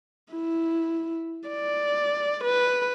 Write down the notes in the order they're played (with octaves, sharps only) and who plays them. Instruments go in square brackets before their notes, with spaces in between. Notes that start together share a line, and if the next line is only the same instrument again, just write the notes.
[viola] E4
D5
B4